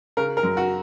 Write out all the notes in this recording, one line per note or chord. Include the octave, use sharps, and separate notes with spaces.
C#3 A#4
A#4
F#2
F#4